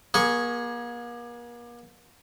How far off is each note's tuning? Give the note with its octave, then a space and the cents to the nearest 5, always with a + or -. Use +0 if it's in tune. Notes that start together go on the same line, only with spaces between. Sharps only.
A#3 +40 G#4 +0 C#6 +0